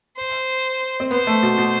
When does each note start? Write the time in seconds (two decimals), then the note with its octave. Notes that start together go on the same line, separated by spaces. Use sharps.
0.17 C5
1.00 C4
1.11 B3 C5
1.27 A3
1.43 B2
1.58 B2